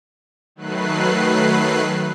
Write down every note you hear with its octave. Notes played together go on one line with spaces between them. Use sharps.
D#3 F#3 A3 B4 F#6 C7